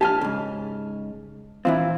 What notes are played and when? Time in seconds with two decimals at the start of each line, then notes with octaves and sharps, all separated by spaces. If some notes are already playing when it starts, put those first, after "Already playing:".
0.01 G4 G#5 A5 F6
0.21 G#2 C#3
1.65 A#2 E3 C4 E4 F4